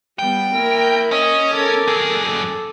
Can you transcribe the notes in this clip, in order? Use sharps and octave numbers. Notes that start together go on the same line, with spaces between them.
G3 B3 G5
A#3 E4 A#4
C#4 D#5
A4 A#4 D6
F#2 G#4
A4